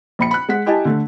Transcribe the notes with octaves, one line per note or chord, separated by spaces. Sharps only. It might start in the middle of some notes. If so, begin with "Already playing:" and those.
A#1 B5 C#7
B5 F#6
G#3 F#5 B6
E4 G4 D#5 G#5 A5
D3 A3